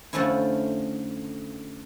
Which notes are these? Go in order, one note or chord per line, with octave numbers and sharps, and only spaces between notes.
F2 D3 F3 A3 C#4 E4